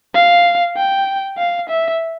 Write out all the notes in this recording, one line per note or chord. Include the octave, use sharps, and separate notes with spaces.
F5
G5
F5
E5